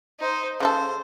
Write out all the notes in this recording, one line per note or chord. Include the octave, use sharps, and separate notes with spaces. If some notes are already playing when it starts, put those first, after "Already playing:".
D#4 C5
C#3 F#4 A4 C5